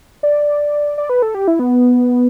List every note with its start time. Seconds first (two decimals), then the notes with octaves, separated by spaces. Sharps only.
0.23 D5
0.98 D5
1.09 B4
1.22 A4
1.35 G4
1.48 E4
1.59 B3